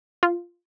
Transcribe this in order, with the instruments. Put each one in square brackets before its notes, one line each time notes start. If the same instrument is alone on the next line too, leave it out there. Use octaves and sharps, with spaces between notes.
[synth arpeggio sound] F4